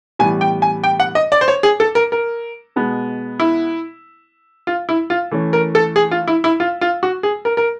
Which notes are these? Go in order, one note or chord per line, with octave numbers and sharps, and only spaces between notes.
A2 E3 G3 B3 G#5
G5
G#5
G5
F#5
D#5
D5
C5
C#5
G#4
A4
A#4
A#4
B2 G#3 B3
E4
F4
E4
F4
E3 A3 C#4
A#4
A4
G#4
F4
E4
E4
F4
F4
F#4
G#4
A#4
A#4